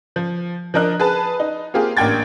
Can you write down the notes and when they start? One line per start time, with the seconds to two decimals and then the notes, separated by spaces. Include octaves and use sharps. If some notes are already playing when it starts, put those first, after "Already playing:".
0.16 F3
0.74 F3 D4 A#4 D#5 F#6
1.00 G#4 B4 A5
1.40 D#4
1.74 A#3 C4 F4 G4 G#4
1.97 A1 A#3 D4 G5 G#6 A6